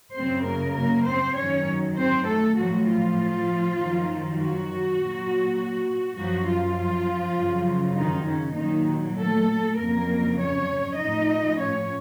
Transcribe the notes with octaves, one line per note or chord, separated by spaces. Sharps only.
F#2 C#3 F#3 C4 C5
A#3 A#4
A#3 A#4
C4 C5
F#2 D#3 F#3 C#4 C#5
C4 C5
A3 A4
A2 F3 F#3 F#4
F3 F4
F#2 D#3 F#3
F#3 F#4
A#2 F#3
F#2 F3 F#3 F#4
F3 F4
F#2 C#3 F#3
D#3 D#4
C#3 C#4
A#2 D#3 F#3 D#4
A3 A4
F2 C#3 F#3 A#3 A#4
C#4 C#5
A2 F3 D#4 D#5
C#4 C#5